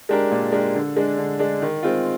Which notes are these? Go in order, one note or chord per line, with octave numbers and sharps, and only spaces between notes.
G#3 D4 G4 A#4
A#2
G#3 D4 G4 A#4
D3
G#3 D4
D3
G#3 D4
D#3
G#3 C4 F4